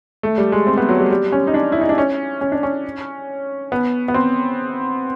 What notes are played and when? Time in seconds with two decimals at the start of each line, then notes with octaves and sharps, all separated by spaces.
0.23 A3
0.38 G3
0.52 G#3
0.67 C4
0.77 B3
0.89 F#3
0.99 G3
1.11 G3
1.32 C#4
1.47 D#4
1.54 D4
1.72 E4
1.81 D#4
1.89 D4
1.98 C#4
2.41 C#4
2.52 D4
2.63 C#4
3.72 B3
4.08 B3
4.14 C4